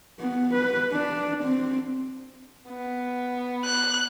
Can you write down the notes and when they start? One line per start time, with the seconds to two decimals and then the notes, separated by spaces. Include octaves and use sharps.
0.20 B3
0.54 B4
0.92 D4
1.43 C4
2.69 B3
3.65 F#6